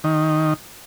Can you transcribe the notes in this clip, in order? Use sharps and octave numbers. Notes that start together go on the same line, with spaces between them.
D#3